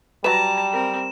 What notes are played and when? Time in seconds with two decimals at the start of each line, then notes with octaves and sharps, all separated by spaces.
0.24 F#3 G3 B4 A5 A#5 E7
0.72 C4 A#4